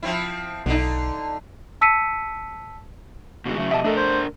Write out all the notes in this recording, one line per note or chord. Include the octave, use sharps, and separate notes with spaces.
F3 C4 E4
B1 D3 D#4
A5 E6 B6 C#7 D#7
B2 D3 G#3 F#4
C#3 F#3 A3
F2 B2 G4 D#5 E5 A5
A3 D4 A4 A#4
C5